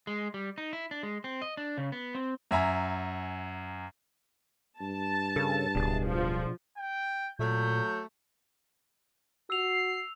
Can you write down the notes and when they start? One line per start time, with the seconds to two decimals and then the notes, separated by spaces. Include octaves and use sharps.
0.07 G#3
0.34 G3
0.58 D#4
0.73 E4
0.91 D4
1.03 G#3
1.24 C4
1.42 D#5
1.57 D4
1.78 C#3
1.92 B3
2.15 C4
2.51 F#2 E5 G#5 A#5
4.81 G2 A5
5.36 C#3 A4 A#4
5.75 D1 B2 D4 G#4
6.06 F3
6.77 G5
7.39 A#2 F#3 A3 G6
9.50 F#4 E6 C7 F7